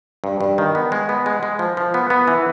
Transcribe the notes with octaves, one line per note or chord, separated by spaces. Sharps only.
G2
G2
D#3
B3
G#3
B3
G#3
G#3
F3
F3
B3
B3
E3